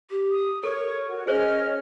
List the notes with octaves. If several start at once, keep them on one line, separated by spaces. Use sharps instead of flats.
G4
D#6
A4 A#4 C#5 C#6
F#4
C#4 G#4 C5 C#5 D#5 F6